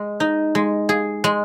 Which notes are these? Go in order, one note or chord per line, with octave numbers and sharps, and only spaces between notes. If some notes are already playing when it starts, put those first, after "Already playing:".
Already playing: G#3
D#4
G#3
G#4
G#3